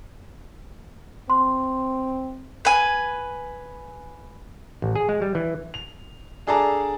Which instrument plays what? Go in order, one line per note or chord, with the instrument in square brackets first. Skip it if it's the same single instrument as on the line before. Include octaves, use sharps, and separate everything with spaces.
[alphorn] C4 [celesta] C6
[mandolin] B4 G#5
[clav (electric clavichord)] A1
G#4
G#3
G3
E3
[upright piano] F7
D4 G#4 A4 D5 A5 A#5